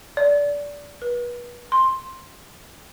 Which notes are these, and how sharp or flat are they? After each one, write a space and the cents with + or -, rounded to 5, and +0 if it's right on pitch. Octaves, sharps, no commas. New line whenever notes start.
D5 -20
B4 -35
C6 +10